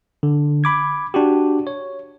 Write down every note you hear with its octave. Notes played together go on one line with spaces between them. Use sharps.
D3
B5 D6 G#6
D4 F#4 G4
C#5